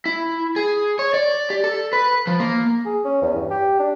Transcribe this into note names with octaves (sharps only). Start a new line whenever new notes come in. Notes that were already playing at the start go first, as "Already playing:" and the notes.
E4
G#4
C#5
D5
G4
A4
B4
F3
A#3
G#4
C#4
E2
G2
G4
D4